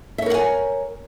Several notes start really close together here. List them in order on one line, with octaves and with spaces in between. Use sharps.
E5 C#5 A#4 F#5 G#5